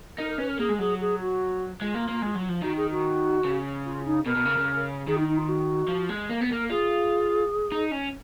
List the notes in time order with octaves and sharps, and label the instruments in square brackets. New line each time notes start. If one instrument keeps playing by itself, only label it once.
[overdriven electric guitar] D#4 [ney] A#4
[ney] A#4
[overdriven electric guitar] C#4 [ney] B4
[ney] A#4
[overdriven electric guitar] A#3 [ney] G#4
[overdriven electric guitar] G#3
[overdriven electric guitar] F#3 [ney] G#4
[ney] G#4
F#4
[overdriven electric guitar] G#3 [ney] F4
[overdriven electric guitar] A#3
A#3
G#3
F#3
F3
[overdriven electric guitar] D#3 [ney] F#4
[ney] G#4
F#4
[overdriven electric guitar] C#3
[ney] F4
D#4
[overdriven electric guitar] B2 [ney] A#4
[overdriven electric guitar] B2
C#3
C#3
[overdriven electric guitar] D#3 [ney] G#4
[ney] D#4
D#4
F4
F#4
[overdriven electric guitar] F3
G#3
A#3
B3
[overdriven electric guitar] A#3 [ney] A#4
[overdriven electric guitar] F4 [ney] G#4
[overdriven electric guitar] D#4
C#4